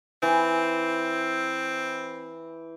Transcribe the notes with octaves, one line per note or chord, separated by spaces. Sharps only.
E3 C4